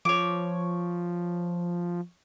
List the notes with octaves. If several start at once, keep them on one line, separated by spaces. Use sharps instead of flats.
F3 C#5 D6